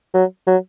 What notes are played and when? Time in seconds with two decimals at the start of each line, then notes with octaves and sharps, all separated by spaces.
0.14 F#3
0.47 F#3